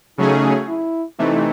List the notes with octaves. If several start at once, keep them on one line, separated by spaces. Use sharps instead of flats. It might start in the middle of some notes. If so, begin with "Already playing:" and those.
C#3 F#3 A3 C#4 D#4 G#4
E4
C3 E3 A3 D#4